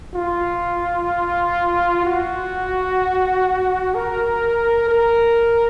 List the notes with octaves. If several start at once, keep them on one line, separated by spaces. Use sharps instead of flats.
F4
F#4
A#4
A#4